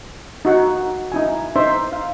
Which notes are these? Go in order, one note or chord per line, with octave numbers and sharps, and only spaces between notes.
D#4 F#4 F#5
D#4 E4 G#5
D#4 C5 E5 C6
F5